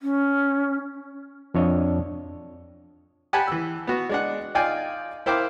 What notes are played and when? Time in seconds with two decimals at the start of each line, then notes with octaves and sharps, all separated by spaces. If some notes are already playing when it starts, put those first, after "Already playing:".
0.02 C#4
1.55 F2 D4 C#5 D#5
3.33 G4 F#5 G#5 A5 B5
3.47 E3 E6
3.87 B3 F#4
4.09 G#3 D4 F#5
4.55 D#4 F4 D5 F5 G5 G#5
5.26 E4 A#4 C5 F5 G5 D6